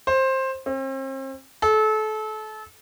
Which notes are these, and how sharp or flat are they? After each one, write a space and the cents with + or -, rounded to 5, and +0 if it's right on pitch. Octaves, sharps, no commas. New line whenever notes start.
C5 +15
C4 +40
A4 -30